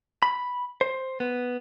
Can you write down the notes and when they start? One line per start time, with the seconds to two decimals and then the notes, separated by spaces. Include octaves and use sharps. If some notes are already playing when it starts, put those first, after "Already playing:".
0.23 B5
0.81 C5
1.20 B3